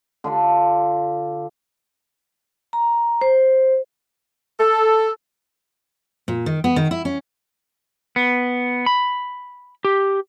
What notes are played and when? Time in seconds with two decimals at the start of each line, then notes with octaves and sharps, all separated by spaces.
0.24 D3 F4 D5
2.73 A#5
3.21 C5
4.58 A4
6.28 A#2
6.46 D#3
6.64 B3
6.76 D#3
6.91 E4
7.05 C#4
8.16 B3
8.86 B5
9.85 G4